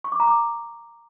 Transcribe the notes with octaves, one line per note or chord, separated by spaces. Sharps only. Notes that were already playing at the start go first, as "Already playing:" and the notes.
C#6
D6
A#5
D6